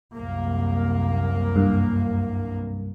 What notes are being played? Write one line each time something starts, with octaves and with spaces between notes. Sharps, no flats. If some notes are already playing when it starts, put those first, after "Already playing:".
C2 F#2 A#3
G2